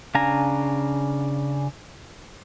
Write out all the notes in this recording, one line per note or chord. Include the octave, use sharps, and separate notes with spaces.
C#3 D4 F5 G#5 A#5